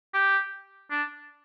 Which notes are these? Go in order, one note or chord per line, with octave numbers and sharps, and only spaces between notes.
G4
D4